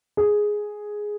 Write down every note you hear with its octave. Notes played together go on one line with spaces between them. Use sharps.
G#4